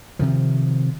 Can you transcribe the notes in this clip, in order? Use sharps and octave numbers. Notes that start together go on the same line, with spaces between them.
C3 D#3 F3